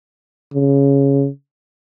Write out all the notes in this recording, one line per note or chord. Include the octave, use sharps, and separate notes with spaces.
C#3